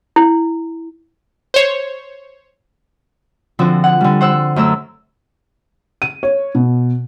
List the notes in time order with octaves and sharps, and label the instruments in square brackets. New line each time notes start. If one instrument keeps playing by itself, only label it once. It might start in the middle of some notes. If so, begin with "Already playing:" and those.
[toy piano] E4
[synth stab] C5 C#5
[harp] D3 F3 C4 F#4
F#5
D3 G3
C5 F#5 E6
F#2 A3 A#5 E6
[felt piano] D#7
C#5
B2